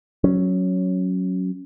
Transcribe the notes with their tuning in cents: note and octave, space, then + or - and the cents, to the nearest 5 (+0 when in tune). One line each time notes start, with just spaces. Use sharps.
F#3 +0 C#4 +0